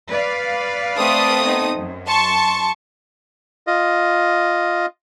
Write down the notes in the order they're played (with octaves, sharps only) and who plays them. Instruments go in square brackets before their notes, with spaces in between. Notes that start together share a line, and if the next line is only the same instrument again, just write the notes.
[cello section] B4 D5 F5
[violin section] A3 C4 D#6
[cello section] B3 D#4
F#2
[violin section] A5 C6 C#6
[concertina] F4 D#5